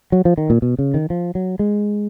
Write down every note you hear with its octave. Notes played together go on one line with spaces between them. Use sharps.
F#3
F3
D#3
A#2
B2
C#3
D#3
F3
F#3
G#3